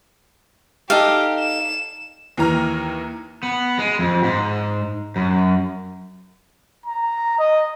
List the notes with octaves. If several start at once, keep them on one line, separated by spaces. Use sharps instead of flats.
D#4 G4 A4 F5
E7
D#2 E3 A#5 F6
B3
G#3
F2
G#2
F#2
A#5
D#5